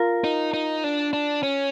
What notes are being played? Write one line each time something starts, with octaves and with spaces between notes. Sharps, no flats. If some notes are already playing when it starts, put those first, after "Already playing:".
Already playing: F4 A#4
D#4
D#4
D4
D4
C#4